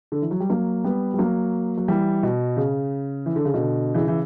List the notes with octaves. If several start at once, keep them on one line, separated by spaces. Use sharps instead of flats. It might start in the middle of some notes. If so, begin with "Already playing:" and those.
D3
E3
F#3
G3
F#3 A#3
G3 B3
G3
F#3 A#3
F#3
E3 G3
B2
C#3
E3
D3
C#3
B2 D3
C#3 E3
E3